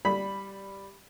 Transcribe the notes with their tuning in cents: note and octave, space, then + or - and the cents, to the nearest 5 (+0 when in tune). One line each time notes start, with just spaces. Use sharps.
G3 +0 B5 +0